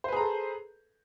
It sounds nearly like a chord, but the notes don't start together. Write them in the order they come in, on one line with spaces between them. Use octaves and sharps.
C5 B4 G#4 A#5 A4